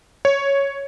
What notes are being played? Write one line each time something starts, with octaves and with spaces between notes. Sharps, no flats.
C#5